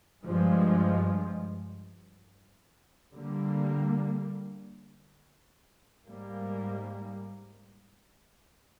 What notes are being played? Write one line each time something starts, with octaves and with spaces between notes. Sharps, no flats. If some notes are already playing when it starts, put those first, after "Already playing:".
G2 F3 G#3
D3 G3 A#3
G#2 G3 A#3